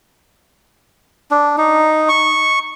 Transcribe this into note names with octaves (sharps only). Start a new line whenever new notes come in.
D4
D#4
C#6